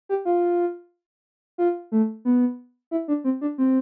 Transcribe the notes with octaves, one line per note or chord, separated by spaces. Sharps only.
G4
F4
F4
A3
B3
E4
D4
C4
D4
C4